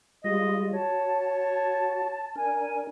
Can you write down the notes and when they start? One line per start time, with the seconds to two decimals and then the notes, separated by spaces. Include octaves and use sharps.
0.24 G3 G#3 F4 D#5
0.73 F#4 C#5 A5
2.36 D4 A#4 G#5